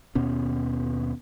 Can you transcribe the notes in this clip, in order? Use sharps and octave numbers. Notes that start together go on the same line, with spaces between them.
D#2 B2 B3 C#4